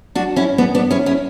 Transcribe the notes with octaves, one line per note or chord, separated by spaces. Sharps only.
D4 F#4
C#4 E4
B3 D4
B3 D4
C#4 E4
C#4 E4